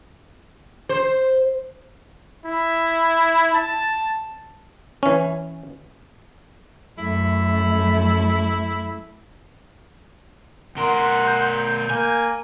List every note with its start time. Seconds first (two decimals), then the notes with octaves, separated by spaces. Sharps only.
0.89 C5
2.46 E4
3.54 A5
5.03 E3 C#4
6.98 F#2 A3 E4
10.76 B2 A#4 F#5 C6
11.27 G6
11.90 A#3 G#5